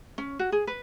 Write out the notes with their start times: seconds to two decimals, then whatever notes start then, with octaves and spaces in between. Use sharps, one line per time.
0.18 C#4
0.39 F#4
0.52 G#4
0.67 B4